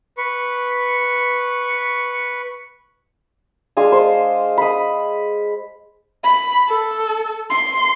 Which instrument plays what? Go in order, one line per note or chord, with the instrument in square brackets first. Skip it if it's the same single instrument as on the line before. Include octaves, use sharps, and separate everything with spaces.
[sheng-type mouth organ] B4 C#6
[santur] G#3 D4 F5 G#5
C5
B5 D#6
[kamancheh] B5
A4
C6